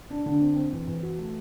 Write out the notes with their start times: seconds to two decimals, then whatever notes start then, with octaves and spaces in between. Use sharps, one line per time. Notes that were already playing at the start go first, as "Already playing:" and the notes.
0.10 D4
0.26 D3
0.41 C4
0.56 C4
0.72 E2
0.87 E2
1.03 F#4
1.18 A3